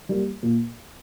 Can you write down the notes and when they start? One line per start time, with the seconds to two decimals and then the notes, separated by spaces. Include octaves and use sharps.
0.09 G3 A#3
0.43 A#2